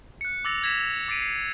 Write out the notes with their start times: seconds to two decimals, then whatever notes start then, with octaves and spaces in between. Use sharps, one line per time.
0.21 F#6 C#7
0.45 D6 E6 A6 A#6 F7
0.63 E6 G#6 A#6 B6 E7
0.79 E6
1.08 D6 A6 B6 C7 D7 D#7
1.22 C7